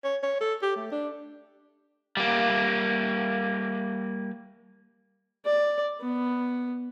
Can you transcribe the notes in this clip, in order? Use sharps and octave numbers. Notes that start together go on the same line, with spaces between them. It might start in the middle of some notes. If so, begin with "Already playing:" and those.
C#5
C#5
A4
G4
A3
D4
G3 A#3
D5
B3